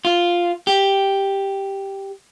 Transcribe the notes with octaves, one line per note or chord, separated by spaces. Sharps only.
F4
G4